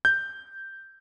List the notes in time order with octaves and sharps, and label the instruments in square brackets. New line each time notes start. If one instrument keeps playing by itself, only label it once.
[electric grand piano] G6